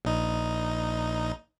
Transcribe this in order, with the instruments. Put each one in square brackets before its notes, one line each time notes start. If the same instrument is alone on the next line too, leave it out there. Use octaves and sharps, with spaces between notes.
[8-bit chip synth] A#1 D#4